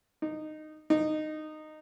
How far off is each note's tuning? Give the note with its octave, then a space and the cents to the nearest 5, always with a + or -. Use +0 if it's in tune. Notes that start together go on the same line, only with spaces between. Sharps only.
D#4 -15
D#4 -15